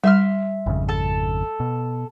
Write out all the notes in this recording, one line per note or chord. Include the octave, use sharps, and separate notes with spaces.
G3 E5 C6 F6
G#1 F2 C#3
A4 A5
B2